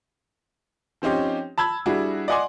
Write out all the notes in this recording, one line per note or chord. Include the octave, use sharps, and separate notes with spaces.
F3 C4 C#4 D#4 G4
A5 B5 E6 G#6
G3 D4 E4 F#4 G#4
D5 D#5 F#5 G#5 C6 D6